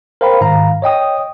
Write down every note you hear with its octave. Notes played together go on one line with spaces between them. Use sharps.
A#4 C5 F5 G5 B5
G#2 D#3 F5 A#5
C#5 D#5 G5 D#6